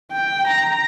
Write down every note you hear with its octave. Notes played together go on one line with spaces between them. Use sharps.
G5
A#5